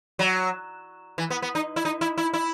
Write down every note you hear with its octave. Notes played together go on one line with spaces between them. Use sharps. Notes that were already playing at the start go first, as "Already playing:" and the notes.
F#3
E3
B3
B3
D#4
E4
D#4
E4
E4
E4